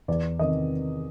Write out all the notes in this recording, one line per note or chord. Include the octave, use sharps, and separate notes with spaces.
E2 D5
C3 D#3 D#5